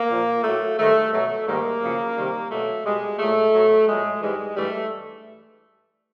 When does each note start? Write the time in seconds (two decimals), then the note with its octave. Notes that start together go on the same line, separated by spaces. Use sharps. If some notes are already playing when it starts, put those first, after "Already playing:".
Already playing: A#3
0.10 A#2 F3
0.44 A2 F#3 A3
0.78 G#2 D#3 G3 A3
1.12 B2 F#3 A3
1.47 G#2 D#3 G3 A#3
1.82 F#2 C#3 F3
2.16 C3 D#3 G3
2.50 B2 F#3 A3
2.85 B2 G3 G#3
3.19 A#2 F#3 A3
3.53 B2 F#3
3.88 A#2 F#3 G#3
4.22 G#2 E3 G3 G#3
4.56 G2 E3 G3 A3